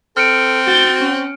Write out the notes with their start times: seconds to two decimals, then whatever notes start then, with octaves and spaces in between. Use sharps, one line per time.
0.17 C4 A4 F6 C#7 D7
0.67 F#4 G6 A6
1.00 C#4